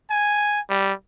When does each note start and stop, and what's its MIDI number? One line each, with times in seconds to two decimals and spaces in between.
0.10 0.60 80
0.69 0.93 55